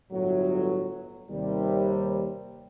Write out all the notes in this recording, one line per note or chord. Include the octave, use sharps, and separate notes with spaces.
G1 A2 F#3
D#2 C3 G3